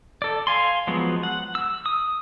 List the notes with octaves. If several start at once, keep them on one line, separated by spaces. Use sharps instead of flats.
A4 D5
F5 G#5 C6
F3 F#3 G#3 B3
F#5
E6
D#6